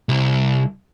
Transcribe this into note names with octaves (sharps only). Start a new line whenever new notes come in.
C2